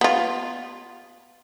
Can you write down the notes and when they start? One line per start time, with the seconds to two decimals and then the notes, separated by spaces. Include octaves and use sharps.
0.01 B3 F4